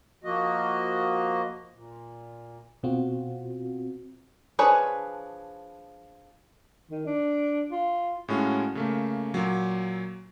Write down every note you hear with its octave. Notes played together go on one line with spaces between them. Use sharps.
F3 A#3 F#4 D#5
A#2
B2 C4 F4 F#4
F3 D4 G#4 B4 C#5
D#3
D4
F4
A2 G#3 C#4 F4 F#4
C#3 A3 A#3
A#2 F#3